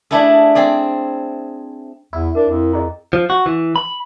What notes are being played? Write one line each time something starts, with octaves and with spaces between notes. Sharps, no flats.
A3 D4 E4 G#4 A4
C4 G#4 D5
E2 E4
D4 A#4
F2
E4 G#4 D#5
F3
F#4
E3
B5